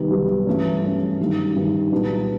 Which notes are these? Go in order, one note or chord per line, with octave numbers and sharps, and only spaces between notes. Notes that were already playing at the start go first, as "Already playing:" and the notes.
Already playing: C2 C3 D#3 F#3 B3
C2 C3 D#3 F#3 B3
G2 E3 A3 C#4
G2 E3 A3 C#4
G2 D#3 F#3
G2 D#3 F#3
C2 A#2 F#3 B3 D4